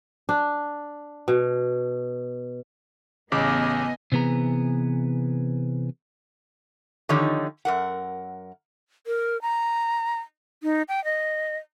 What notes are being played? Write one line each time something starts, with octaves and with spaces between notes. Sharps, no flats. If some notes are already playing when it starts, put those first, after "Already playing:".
D4
B2
A1 C#3 B3 D#5 G#5 D6
C3 E3 B3 G#4 A#5
D3 D#3 F3 D#4 G4 C#5
F#2 A#4 F#5
A#4
A#5
D#4
G5
D#5